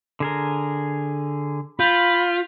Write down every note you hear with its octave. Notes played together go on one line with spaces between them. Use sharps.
D3 G#4 A#4
F4 B5 G6 B6